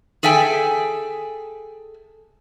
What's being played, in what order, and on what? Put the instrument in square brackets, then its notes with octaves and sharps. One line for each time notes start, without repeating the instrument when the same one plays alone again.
[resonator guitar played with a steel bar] G#4 A4 E5 G5 G#5